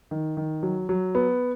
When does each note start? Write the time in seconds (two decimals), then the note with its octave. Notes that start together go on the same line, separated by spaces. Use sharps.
0.11 D#3
0.37 D#3
0.63 F#3
0.89 F#3
1.15 B3